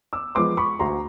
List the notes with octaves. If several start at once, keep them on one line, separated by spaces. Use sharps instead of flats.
D6 E6
F3 G#3 B3 C6 D6
B5 C#6
D2 A#5 C6